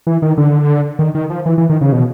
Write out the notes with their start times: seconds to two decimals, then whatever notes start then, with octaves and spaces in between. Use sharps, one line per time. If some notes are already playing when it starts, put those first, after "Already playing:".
0.07 E3
0.22 D#3
0.38 D3
0.99 D#3
1.15 D#3
1.30 F3
1.46 E3
1.58 E3
1.70 D#3
1.81 C#3
1.92 B2